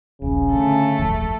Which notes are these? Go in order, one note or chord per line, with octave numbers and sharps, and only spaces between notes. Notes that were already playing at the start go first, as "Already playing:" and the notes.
D#1 A#1 C#3
D3 A3 A4
D#1 G#1 F2